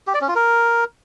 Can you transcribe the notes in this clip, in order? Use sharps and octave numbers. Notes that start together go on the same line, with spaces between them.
G4
D5
C#4
F4
A#4